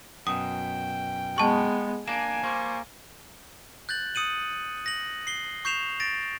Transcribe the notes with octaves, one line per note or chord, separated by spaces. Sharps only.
F#2 B2 G5 D#6
G#3 B3 A5 C#6
A#3 D4 G#5 E7
G3 A#3 C5 C#6
F#6 G6 A6 F#7
D#6 C#7 D#7 F#7
A#6 F#7
C7 G7
C#6 G6 C7 E7 F7
A6 A#6 D7